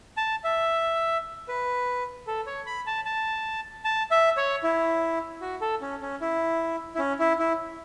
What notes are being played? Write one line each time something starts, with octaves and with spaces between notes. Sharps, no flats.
A5
E5
B4
A4
C#5
B5
A5
A5
A5
E5
C#5
E4
F#4
A4
C#4
C#4
E4
E4
C#4
E4
E4